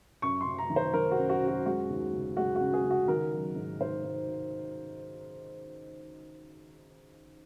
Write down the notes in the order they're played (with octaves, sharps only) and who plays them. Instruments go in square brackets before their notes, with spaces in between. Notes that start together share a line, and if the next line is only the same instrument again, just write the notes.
[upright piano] F#2 C#6
C6
F#2
A#5
D#3
C5
D#3 A#4
F#4
F#2
F#4
F#2
F#4
G#3 F#4
D#2
C#3
G#3 F#4
C#3 F#4
G#4
C#3
F#4
D#3 A#4
F#3
G#2
G#2 C5
G#2